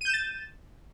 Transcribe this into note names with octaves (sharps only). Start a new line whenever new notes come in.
G6 A6 D#7 E7